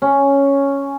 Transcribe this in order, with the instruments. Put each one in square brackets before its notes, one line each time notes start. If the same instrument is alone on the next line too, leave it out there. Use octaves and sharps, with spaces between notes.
[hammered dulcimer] C#4